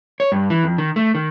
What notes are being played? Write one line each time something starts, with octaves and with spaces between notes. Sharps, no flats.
C#5
G2
E3
F2
D#3
A3
D#3